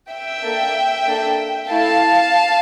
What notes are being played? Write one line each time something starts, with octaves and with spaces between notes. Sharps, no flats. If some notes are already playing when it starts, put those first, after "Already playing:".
E5 G5
A#3 D4 A4
A#3 D4 A4
A3 E4 A4 F5 A5